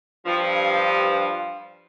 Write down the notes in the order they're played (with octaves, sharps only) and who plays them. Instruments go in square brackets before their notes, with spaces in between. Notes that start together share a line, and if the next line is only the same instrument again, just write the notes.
[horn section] G2 F3